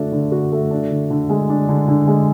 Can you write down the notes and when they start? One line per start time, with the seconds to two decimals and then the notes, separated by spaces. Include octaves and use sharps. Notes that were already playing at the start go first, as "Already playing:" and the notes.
Already playing: D3 A3 D4 F#4
0.12 D3
0.32 F#4
0.52 A3
0.71 D4
0.91 D3
1.10 D3
1.29 G#3
1.49 D4
1.69 D3
1.88 D3
2.07 G#3